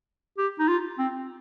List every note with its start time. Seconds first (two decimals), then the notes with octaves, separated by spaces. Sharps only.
0.38 G4
0.59 D#4
0.68 F4
0.98 C4